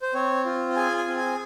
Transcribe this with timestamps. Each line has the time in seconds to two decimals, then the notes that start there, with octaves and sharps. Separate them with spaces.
0.02 C5
0.14 C4 C#5
0.45 F4
0.76 G#4 G#5
0.97 G#5
1.08 C4
1.18 G#5